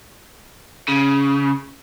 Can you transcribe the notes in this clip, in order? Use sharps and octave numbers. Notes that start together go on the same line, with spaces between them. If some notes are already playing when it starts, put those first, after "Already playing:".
C#3